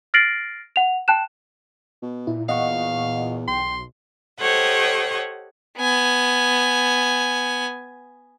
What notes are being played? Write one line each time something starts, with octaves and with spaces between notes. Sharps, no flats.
F6 A6 A#6 C7 D7 F#7
F#5 F7
G5 A5 F#6 E7
B2
A#2 E4
E2 D#5 F5 F#5 C#6
B1 G5 C6
G4 A4 C5 C#5 D#5 F#5
B3 G#5